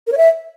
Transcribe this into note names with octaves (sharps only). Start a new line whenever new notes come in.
A#4
C#5
E5